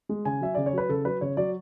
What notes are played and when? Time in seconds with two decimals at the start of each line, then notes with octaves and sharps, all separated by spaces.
0.09 G#3
0.25 C#3 G#5
0.41 F#3 E5
0.55 C#3 D5
0.66 C#5
0.73 F#3 B4
0.89 C#3 A4
1.05 F#3 B4
1.21 C#3 C#5
1.37 F#3 D5